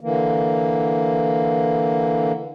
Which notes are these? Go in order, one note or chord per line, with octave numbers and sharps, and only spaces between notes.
D3 E3 A#3